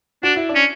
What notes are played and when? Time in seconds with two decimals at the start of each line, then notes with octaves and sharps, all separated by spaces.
0.23 D4 F#4
0.36 E4
0.49 D4
0.55 C#4